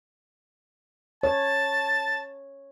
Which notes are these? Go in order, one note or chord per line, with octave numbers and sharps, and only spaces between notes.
C#5 A5